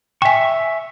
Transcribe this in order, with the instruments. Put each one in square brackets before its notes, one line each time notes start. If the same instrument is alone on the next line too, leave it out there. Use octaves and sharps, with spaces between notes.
[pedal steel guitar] E5 C#6 [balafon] G5 G#5